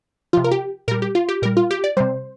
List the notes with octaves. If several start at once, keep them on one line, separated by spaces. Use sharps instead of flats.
C3 F3 F4
A#4
G4
A#2 G3 A#4
G4
F4
G4
A#2 G3 A#4
F4
G4
D5
C3 G3 C5